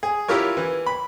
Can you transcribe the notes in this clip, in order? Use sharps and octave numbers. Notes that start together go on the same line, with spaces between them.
G#4
E4 F4 G4 A#4 C#5
E3
B5